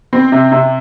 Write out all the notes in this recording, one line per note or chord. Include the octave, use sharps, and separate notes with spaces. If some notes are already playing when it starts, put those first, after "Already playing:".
C4
C3
C3